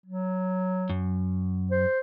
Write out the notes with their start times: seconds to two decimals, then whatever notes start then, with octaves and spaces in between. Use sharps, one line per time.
0.06 F#3
0.90 F#2
1.71 C5